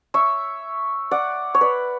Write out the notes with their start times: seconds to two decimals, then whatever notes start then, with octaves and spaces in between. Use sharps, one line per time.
0.14 C#5 E5
1.11 D5 F#5
1.54 C#5
1.61 B4 D5